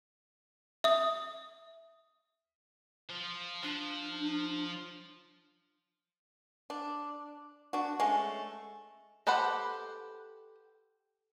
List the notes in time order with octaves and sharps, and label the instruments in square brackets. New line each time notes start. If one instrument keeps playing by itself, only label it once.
[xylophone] E5 D#6
[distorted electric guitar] F3
[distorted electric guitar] F3 [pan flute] D4
[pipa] D4
D4 F#4
G#3 A3 C#4
[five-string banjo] G4 A4 B4 C5 F#5